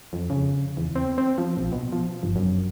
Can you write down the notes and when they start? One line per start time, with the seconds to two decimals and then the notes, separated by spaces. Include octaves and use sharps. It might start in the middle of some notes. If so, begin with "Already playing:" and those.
0.13 F2
0.30 C#3
0.77 E2
0.96 C4
1.18 C4
1.38 F3
1.57 A#1
1.72 B2
1.92 F3
2.23 G1
2.36 F#2